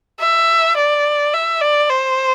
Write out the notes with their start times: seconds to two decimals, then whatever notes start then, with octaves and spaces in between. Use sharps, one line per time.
0.20 E5
0.76 D5
1.33 E5
1.61 D5
1.90 C5